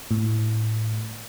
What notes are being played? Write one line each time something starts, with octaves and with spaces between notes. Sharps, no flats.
A2